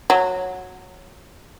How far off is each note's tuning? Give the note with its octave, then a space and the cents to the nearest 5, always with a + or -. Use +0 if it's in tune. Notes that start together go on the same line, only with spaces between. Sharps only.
F#3 -15